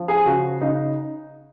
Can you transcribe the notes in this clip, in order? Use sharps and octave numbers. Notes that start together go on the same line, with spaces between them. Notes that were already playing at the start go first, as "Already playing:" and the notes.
Already playing: F3
G#4
C#3 F#4
C#3 D#4